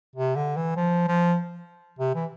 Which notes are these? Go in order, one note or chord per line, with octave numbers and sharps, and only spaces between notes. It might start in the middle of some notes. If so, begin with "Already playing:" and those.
C3
D3
E3
F3
F3
C3
E3